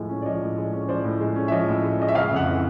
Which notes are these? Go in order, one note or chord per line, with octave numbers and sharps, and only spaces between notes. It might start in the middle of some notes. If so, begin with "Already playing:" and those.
Already playing: A2 F3 G#3
C#4
D5
F3 C#5 D#5
A2
G#3
C#4
F3 C5 D5
A2
G#3
C#4
E5
F3 C#5 D#5
A2
G#3
C#4 D#5
E5
C#3 D#5 F5
F2
E5 F#5
E3